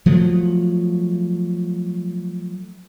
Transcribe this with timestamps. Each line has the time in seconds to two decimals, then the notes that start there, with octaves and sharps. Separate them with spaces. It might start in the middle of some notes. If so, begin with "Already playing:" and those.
0.06 F3 F#3 A3